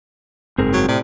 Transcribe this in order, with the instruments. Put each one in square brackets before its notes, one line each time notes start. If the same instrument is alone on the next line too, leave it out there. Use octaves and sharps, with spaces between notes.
[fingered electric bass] F#1 G#2 [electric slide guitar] C4 G#4 A#4
[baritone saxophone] F#3
[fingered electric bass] A2 [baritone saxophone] C3 [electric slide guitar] D5